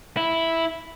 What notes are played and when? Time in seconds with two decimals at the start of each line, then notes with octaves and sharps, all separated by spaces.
0.17 E4